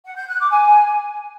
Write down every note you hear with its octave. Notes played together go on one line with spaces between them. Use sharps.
F#5
G6
F#6
D6
G#5